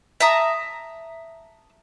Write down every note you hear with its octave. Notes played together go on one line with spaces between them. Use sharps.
E5 A5 A#5 D#6